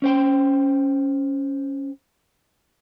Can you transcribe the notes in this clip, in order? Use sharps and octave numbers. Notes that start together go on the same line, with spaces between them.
C#4 C5 G5